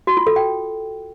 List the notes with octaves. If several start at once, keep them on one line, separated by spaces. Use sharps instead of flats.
F#4
F4
A4
G5